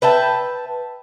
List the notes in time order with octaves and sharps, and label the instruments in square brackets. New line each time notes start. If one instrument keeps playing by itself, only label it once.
[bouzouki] B4 E5 G5 A5